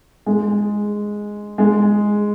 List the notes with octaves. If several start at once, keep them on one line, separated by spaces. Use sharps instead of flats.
G#3
G#3